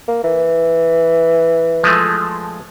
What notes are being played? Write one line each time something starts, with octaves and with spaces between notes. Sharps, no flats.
A#3
E3
F3 G#3 A3